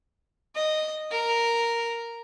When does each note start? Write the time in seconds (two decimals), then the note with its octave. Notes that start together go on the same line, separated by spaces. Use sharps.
0.55 D#5
1.11 A#4